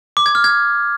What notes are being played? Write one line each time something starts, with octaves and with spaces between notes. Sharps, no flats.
D6
G#6
F6
G#6